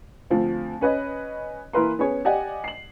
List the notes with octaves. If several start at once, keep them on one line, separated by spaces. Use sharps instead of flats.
D2 F3 C4
C#4 B4 C#5 D#5
E3 A#3 E4 A#4 B4 C6
B3 C#4 G#4 C#5
G4 D5 D#5 F#5 G#5
C7 F#7